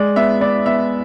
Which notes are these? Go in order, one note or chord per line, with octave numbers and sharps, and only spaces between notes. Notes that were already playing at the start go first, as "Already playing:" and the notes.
Already playing: G#3 D5
B3 E5
B3 D5
B3 E5